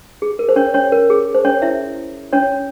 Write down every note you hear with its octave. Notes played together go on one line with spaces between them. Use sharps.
G#4
A#4
C5
C#4 C#5
C#4 C#5
A#4
G#4
C5
C#4 C#5
E4 E5
C#4 C#5